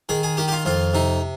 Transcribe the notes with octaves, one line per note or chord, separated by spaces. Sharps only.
D#3 G#4
G#4
D#3 G4
G4
F4
F2 F4
C3 D#4